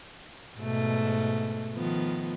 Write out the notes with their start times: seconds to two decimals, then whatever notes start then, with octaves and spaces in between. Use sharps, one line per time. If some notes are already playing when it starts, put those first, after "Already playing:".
0.59 G#2 B2 A3
1.75 D#3 F3 B3